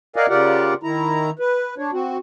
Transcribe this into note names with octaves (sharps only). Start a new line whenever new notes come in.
A#4 D5 D#5 F5 F#5 G#5
C#3 F4 G4 A#4 D5 F#5
D#3 E4 A#5
B4
D4 C#5
C4 F#4